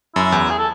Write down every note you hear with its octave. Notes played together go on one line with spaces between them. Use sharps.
F#2 E4
E2
G#4
A4